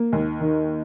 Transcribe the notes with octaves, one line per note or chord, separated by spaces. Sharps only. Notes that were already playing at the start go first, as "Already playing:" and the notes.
Already playing: A#3
D#2
D#3